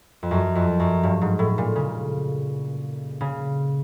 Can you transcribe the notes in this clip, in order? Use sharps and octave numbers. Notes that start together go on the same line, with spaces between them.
F2
F#2
F2
F#2
G2
G#2
A2
A#2
C#3
C#3